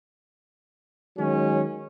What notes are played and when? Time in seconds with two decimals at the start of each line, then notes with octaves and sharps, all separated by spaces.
1.17 D#3 F#3 G#3 C#4